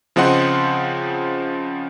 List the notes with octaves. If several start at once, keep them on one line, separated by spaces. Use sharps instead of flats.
C#3 F3 C4 D#5 F#5 C6